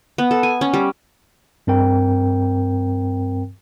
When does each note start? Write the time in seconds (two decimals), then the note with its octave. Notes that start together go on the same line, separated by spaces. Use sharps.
0.18 B3
0.31 A4
0.43 G#5
0.61 C#4
0.74 G3
1.67 G2 C4 A#4 G5